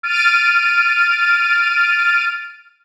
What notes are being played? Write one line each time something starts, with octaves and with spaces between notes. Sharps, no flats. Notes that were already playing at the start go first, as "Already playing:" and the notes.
F6 A6 D7 D#7